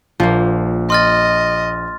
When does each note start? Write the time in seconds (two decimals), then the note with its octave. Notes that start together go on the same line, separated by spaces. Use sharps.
0.20 A#1 F3 A#3
0.90 D#5 C6 F6 A6